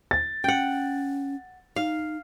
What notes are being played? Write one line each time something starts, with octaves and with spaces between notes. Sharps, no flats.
A6
C#4 F#5 G5
D#4 F5